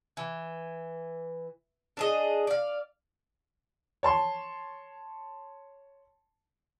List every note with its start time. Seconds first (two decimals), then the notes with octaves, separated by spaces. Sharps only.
0.17 E3
1.97 D4 G#4 D#5
2.47 D5 F5
4.03 C#5 A5 C6 C#6